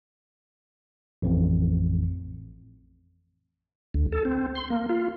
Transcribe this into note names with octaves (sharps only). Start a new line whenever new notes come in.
A1 F2 A2
D2
A4
C4
C6
A#3
F4